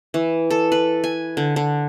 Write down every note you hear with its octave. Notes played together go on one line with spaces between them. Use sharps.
E3
A4
B4
G#5
D3
D3